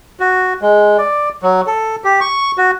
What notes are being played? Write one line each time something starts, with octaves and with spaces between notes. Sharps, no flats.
F#4
G#3
D5
F#3
A4
G4
C#6
F#4